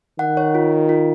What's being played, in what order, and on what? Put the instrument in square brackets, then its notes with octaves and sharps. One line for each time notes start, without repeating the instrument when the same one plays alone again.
[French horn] D#3 [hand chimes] F#5
[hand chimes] C#5
F4
F4
F4